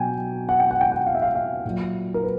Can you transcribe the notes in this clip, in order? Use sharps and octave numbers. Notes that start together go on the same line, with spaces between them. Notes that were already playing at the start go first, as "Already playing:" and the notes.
Already playing: B2 F#3 G5 G#5
F#5
G5
F#5
G5
F#5
F5
E5
F5
F5
A#2 F#3
A#4
B4